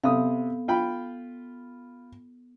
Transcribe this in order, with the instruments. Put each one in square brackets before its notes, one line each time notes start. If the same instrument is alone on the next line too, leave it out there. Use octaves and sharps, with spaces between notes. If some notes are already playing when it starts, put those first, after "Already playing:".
[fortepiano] C3 D#6 [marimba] B3 A4 F5
[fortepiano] F4 G5 B5